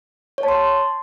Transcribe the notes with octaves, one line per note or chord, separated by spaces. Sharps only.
C#5
A5
C6